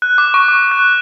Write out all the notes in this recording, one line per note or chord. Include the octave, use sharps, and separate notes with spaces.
F#6
D6
C#6
D6
F#6